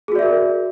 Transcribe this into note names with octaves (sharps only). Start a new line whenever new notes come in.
F#4 G#4 A#4 D5 E5